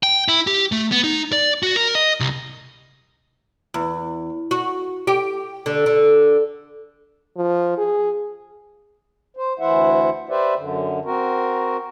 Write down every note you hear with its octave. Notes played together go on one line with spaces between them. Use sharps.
G5
E4
G4
A3
B3
D#4
D5
F#4
A#4
D#5
C2
E2
F#4
G4
D3
D3
F3
G#4
C5
D2 E3 E4 C5 E5 F#5
G4 B4 C5 D5 E5
F#2 D3
C4 F#4 A#4